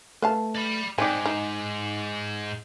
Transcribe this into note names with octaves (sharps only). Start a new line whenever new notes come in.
A3 B4 F5 A5
D5 B5
G#2 C4 D#4 D5 G#5 D6
D#4